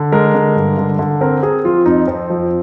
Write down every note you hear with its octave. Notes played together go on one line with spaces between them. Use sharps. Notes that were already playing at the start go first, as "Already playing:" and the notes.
Already playing: D3
G#3 A#4
D3
G2
D3
D3
C4 A#4
C4 G#4
F3 F4
F2 D#4
F2 C4
F3